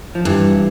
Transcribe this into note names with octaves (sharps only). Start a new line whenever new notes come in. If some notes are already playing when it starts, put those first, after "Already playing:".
F3
G2 E3